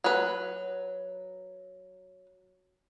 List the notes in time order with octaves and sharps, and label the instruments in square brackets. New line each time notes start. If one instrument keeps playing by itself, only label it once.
[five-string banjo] F#3 B4